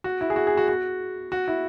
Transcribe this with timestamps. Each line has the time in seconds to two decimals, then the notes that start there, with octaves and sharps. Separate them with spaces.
0.04 F#4
0.21 E4
0.30 G#4
0.36 F#4
0.47 G#4
0.57 F#4
0.68 F#4
1.32 F#4
1.48 E4